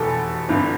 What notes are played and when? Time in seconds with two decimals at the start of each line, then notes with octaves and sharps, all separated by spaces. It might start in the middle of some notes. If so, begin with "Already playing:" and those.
Already playing: F1 E2 B2 G4 A4
0.49 G1 G2 D3